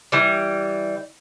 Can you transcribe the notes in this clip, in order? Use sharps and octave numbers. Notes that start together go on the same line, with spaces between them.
E3 G3